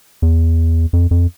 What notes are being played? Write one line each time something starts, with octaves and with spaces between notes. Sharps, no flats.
E2
F2
F2